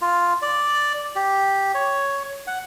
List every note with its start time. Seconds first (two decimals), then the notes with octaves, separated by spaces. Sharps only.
0.01 F4
0.42 D5
1.15 G4
1.74 C#5
2.47 F#5